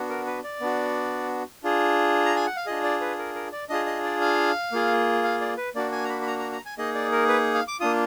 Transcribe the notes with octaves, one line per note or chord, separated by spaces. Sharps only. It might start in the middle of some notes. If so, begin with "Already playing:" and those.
Already playing: B3 D4 F#4
A#4
B4
D5
B3 D4 F#4
D4 F4 G#4
A#5
G#5
F#5
F5
D4 F4 G#4 D#5
D5
B4
A#4
A#4
D5
D4 F4 G#4 D#5
D#5
D5
F5
A#3 F4 G#4
F5
D5
B4
A#3 D4 F#4 D5
G#5
A#5
B5
B5
A#5
A#5
A#5
G#5
A#3 D#4 G#4 D#5
D5
A#4
B4
F5
D6
A#3 D4 F4 D#6